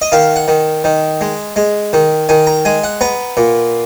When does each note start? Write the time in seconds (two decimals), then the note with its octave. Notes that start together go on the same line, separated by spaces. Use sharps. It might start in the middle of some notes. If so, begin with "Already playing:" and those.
0.02 D#5
0.12 D#3 F5
0.36 F#5
0.48 D#3
0.84 D#3
1.21 G#3
1.56 G#3
1.93 D#3
2.29 D#3 G#5
2.47 A#5
2.65 G#3 G#5
2.84 F#5
3.01 B3 A#5
3.37 A#2